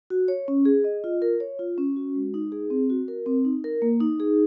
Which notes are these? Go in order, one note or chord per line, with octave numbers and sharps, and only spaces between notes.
F#4
C#5
C#4
G#4
D#5
F4
A#4
C#5
F4
C#4
F#4
G#3
D#4
G#4
C4
F#4
A#4
C4
D#4
A#4
A#3
D#4
G#4